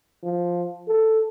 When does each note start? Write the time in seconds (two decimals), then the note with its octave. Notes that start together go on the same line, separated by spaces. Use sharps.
0.24 F3
0.88 A4